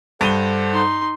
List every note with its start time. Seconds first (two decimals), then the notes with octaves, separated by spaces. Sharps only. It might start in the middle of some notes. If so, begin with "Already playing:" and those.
0.21 G2 A4 C5 F#5 D#7 G7
0.72 D#4 C6